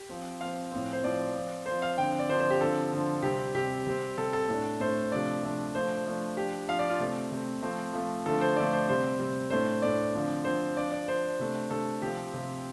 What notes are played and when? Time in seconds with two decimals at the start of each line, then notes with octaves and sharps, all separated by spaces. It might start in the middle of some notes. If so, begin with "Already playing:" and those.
Already playing: G4
0.09 F3 C4
0.41 F3 C4 F5
0.71 A2 F3 C4
0.93 C5
1.04 A2 F3 C4 D5
1.35 F3 C4
1.66 F3 C4 C5
1.82 F5
1.97 D3 F3 C4 G5
2.19 D5
2.29 D3 F3 C4 C5
2.40 C5
2.50 G4
2.61 D3 F3 C4 A4
2.92 D3 F3 C4
3.23 C3 G3 C4 G4
3.54 C3 G3 C4 G4
3.86 C3 G3 C4
4.17 C3 G3 C4 A4
4.33 A4
4.49 A2 A3 D4
4.80 A2 A3 D4 C5
5.12 C3 F3 A3 D4 D5
5.43 C3 F3 A3 D4
5.75 F3 A3 D4 C5
6.05 F3 A3 D4
6.36 F3 D4 G4
6.68 F3 D4 F5
6.79 D5
6.90 F4
6.99 C3 A3 C4
7.32 C3 A3 C4
7.62 F3 A3 C4
7.93 F3 A3 C4
8.26 D3 F3 A3 A4
8.41 C5
8.56 D3 F3 A3 D5
8.73 C5
8.88 C3 G3 C4 C5
9.19 C3 G3 C4
9.50 A2 A3 D4 C5
9.82 A2 A3 D4 D5
10.14 D3 F3 C4
10.44 D3 F3 C4 C5
10.76 F3 D4 D5
10.92 D5
11.08 F3 D4 C5
11.40 C3 A3 D4
11.70 C3 A3 D4 A4
12.02 C3 F3 C4 G4
12.34 C3 F3 C4